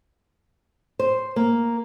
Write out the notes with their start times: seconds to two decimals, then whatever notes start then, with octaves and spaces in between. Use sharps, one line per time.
0.99 C5
1.36 A#3